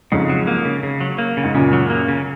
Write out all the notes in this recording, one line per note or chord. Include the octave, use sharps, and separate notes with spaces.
F2 G#2 C#3
F#3
A#3
C#3
C#3
F#3
A#3
C#3
G#2
F#2 A#2 C#3
F#3
A#3
C#3